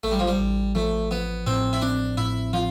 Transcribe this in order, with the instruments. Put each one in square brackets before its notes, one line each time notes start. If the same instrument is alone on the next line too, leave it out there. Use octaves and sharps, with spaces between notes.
[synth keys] A1 [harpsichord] A3
[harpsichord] G3
F3
G3
[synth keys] A1
[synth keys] F3 [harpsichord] A3
[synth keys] F3 [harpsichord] B3
[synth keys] A2 [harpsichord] C4
[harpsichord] E4
[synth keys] C4 [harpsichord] D4
[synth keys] A2 [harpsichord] E4
[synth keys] F3 [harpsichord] F4